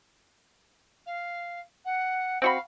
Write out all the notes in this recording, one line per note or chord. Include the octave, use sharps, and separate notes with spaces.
F5
F#5
C4 F#4 F5 B5